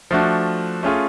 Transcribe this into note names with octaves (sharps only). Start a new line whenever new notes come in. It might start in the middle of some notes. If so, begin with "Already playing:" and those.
F3 A3 D4 F#4
A3 C#4 F4 G#4